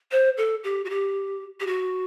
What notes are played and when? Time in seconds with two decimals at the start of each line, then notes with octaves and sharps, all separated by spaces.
0.12 C5
0.37 A4
0.64 G4
0.85 F#4
0.90 G4
1.60 G4
1.67 F#4